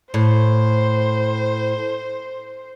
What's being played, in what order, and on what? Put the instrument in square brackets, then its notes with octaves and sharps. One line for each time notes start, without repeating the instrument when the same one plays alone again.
[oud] A2 [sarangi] C5